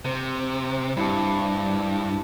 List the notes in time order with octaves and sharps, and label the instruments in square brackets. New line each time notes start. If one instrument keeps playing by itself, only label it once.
[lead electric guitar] C3 [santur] C5
[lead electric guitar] G2 [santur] E4 G4 A5